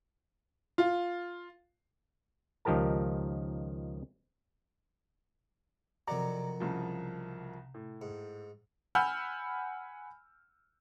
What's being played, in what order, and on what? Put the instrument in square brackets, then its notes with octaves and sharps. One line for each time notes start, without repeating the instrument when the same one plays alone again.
[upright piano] F4
[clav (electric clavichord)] C#2 D#3 F3 G4 A#4 A5
[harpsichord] F2 D#3 F#3 [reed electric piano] C3 A#5 [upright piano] D5
[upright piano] C2 C#3 F3
A2
[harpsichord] G#2
[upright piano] F#5 G#5 B5 E6 F6 G6